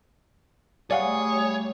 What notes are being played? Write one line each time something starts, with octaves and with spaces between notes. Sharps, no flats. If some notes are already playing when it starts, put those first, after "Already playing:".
G3 A3 G#4 C#5 D5 F5 F#5 D#6